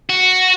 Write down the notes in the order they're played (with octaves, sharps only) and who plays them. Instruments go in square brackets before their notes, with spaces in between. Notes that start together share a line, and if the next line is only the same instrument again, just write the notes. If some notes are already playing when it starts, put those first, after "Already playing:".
[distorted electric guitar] F#4